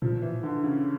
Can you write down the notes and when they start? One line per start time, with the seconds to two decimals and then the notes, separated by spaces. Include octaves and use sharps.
0.02 A#2 F3
0.22 E3
0.43 D3
0.64 C#3